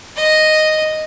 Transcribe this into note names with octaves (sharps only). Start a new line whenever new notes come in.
D#5